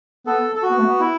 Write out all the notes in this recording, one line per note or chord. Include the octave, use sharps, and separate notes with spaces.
B3 A4
A4
F#4
B3
A3
B3
E4